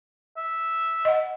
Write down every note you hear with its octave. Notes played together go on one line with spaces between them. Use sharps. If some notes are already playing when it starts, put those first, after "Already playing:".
E5
D#5 F#5